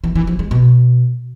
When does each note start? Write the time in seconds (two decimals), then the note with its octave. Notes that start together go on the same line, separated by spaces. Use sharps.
0.04 E3
0.15 E3
0.27 F3
0.39 G#3
0.51 B2